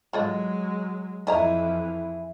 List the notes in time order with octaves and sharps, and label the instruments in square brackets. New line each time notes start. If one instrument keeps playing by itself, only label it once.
[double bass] F#3 G#3 [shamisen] F4 A4 D#5
[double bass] F2 E3 [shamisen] F3 D#5 A#5 [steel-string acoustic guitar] E4 G#4